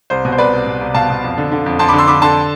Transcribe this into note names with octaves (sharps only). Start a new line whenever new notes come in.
C2 C5
B2
C5
C2 B4 D5
C2
B2
C2
B2 F5 A5
B2
F2
D3
D3
F2
F2 A5 C6
D3 B5 D6
C6 E6
D3 B5 D6
D3 A5 C6